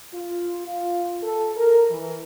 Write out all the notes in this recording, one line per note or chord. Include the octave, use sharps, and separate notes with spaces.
F4
F4
A4
A#4
E3